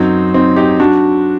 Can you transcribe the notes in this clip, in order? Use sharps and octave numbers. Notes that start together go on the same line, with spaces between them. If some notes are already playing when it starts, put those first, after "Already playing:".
Already playing: F#2 F#3 C4 D#4
C4 D#4
D#4 G4
F#3 D4 F#4